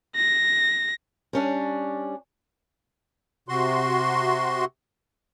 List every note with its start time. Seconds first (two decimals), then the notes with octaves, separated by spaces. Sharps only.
0.16 A#6
1.33 G3 C#4 D4
3.49 C3 F#4 C6